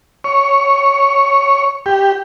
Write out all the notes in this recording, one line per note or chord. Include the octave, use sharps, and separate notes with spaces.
C#5
G4